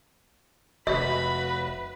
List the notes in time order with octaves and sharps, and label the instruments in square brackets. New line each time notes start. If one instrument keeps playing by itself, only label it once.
[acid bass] F1 [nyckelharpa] F#4 B5 [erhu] B4 [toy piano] E5